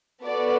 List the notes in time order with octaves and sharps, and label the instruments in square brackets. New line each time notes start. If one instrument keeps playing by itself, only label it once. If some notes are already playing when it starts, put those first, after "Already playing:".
[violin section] B3 F#4 A4 D5